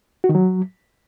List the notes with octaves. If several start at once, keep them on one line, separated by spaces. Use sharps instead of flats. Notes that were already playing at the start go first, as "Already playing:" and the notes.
F#4
D#3
F#3